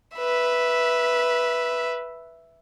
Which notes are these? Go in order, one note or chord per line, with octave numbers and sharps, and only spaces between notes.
B4 E5